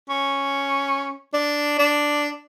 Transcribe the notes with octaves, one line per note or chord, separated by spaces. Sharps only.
C#4
D4
D4